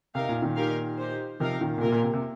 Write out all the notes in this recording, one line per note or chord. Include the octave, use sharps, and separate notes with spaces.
C3 D#4 A#4 F5
A#2
A#2 D#3
D#4 G4 A#4 F5
D#4 G4 C5
C3 F3 D#4 A#4 F5
A#2 D#3
A#2
C3 A#3 F4 A#4
A#2
C3
C3